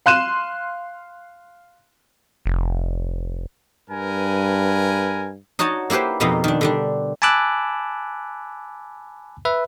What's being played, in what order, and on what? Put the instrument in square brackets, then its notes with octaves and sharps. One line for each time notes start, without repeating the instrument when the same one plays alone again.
[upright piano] F5 C6 F#6 D#7 E7
[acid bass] F1
[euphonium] G2 [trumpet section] A#4 B4 G#5
[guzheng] D#4 F#4 C#5 D#5 A5
A#3 E4 G4 B4 C5
F2 B2 A#3 B3 D#4 G4
D#3 D4
D3 G3 D4
[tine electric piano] G#5 A5 B5 D6 E6 F#6
B4 E5